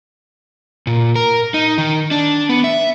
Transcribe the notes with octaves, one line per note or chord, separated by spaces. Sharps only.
A#2
A#4
D#4
D#3
D4
B3
E5